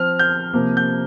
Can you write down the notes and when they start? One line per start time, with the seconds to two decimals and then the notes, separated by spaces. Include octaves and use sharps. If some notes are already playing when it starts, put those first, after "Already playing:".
Already playing: F3 C4 F6
0.19 G6
0.53 C3 F3 A#3
0.77 G6